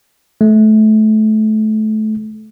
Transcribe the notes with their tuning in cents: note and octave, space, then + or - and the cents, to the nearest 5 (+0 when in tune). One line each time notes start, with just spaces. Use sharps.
A3 -25